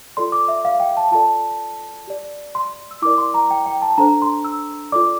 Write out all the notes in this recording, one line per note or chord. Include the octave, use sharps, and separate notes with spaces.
F4 A4 D5 C6
D6
E5
F5
G5
A5
F4 A4 D5 A5
G4 D5
C6
E6
E4 A#4 D5 D6
C6
A#5
G5
G5
A5
D4 A4 C5 A#5
C6
E6
F4 A4 D5 D6